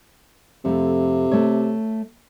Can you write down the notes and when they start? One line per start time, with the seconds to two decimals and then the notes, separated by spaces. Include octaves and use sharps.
0.65 F2 C3 A3
1.31 A3 C#5